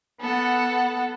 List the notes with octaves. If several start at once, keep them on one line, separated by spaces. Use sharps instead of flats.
B3 A4 F#5